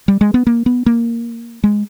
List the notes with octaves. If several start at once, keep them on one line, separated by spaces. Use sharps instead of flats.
G3
G#3
B3
A#3
B3
A#3
G#3